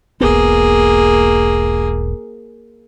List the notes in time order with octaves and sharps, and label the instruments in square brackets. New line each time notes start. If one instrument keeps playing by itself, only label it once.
[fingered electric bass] E1 B1 B3 [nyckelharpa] A#3 G#4